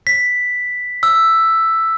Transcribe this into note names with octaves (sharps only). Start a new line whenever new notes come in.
B6
E6